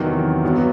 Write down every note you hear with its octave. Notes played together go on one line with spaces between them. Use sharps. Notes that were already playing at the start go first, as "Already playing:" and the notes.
Already playing: E2 C3 D#3 F#3 C4
G2 F#3 B3